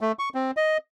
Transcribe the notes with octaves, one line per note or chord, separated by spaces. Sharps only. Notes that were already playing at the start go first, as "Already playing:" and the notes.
A3
C#6
C4
D#5